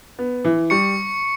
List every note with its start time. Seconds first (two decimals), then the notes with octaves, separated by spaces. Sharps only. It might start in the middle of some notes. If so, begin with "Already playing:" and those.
0.19 B3
0.45 E3
0.70 G3 C#6 C#7